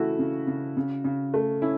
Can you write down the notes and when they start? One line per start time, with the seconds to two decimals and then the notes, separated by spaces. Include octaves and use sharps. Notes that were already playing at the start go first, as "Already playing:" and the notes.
Already playing: C#3 E3 A3 E4 F#4
0.19 C#3
0.47 C#3
0.77 C#3
1.04 C#3
1.34 A3
1.62 C#4 E4